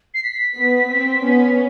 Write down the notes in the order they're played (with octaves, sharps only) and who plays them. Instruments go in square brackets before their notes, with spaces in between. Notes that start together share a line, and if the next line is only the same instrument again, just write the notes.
[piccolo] C7
B6
[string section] B3
C4
B3 C#4